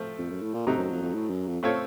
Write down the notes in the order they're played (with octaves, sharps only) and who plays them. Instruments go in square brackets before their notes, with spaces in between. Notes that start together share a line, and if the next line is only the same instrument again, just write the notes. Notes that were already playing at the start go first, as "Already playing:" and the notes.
Already playing: [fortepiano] F3 A3 C4
[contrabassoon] F2
F#2
A2
A#2
[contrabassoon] C3 [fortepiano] F#3 A3 C4 D#4
[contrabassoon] F#2
F2
F2
A2
F#2
F2
[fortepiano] A3 C4 F4 A4 C#5